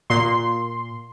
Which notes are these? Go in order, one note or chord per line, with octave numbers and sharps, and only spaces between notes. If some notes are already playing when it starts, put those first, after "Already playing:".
A#2 C6